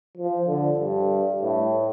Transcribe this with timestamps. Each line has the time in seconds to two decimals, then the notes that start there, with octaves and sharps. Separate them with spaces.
0.17 F3
0.48 D3
0.79 G2
1.42 A2